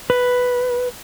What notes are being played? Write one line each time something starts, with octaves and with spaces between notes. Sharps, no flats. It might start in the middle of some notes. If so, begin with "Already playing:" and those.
B4